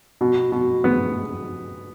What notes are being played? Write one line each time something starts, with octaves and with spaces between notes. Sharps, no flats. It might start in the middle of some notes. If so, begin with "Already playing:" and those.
B2
B2
B3